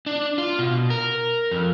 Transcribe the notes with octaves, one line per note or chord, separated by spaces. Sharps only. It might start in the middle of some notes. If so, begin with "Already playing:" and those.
D4
F4
B2
A#4
F2